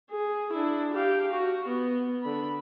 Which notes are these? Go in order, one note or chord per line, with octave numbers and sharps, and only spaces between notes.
G#4
D4 E4
G4 F5
F#4
B3
D3 B5